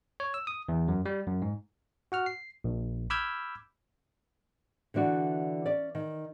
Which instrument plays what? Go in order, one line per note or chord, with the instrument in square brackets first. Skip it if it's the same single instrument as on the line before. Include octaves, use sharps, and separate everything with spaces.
[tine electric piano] C#5
E6
D#6
E2
F#2
G3
F#2
G#2
F#4 F#5 F6
C7
A#1
B5 D6 E6 F6 G6 G#6
[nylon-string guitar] D3 E3 D4 F#4
C#4 D5
D#3